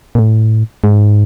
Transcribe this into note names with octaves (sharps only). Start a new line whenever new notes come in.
A#2
A2
G#2